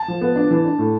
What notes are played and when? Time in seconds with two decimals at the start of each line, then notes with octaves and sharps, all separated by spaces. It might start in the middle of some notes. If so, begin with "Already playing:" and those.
Already playing: A5
0.08 F3
0.21 B3
0.36 D4
0.51 E3
0.65 D4
0.79 A2